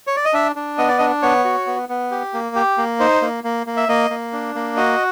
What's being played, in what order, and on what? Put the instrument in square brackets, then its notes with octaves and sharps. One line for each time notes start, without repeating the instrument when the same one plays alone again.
[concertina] C#5
D5
D#5
D4 E5
D4
B3 D#5
D5
D4 D#5
B3 C#5
F#4
B3
B3
G4
A#3
G4
A#3
D#4 C5
A#3
A#3
A#3
E5
A#3 D#5
A#3
D4
A#3
F#4 D#5